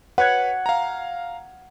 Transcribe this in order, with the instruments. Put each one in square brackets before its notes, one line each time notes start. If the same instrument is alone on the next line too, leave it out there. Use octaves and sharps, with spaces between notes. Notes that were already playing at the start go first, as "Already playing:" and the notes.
[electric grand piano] B4 C#5 G#6 [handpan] F#5
[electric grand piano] F5 A#5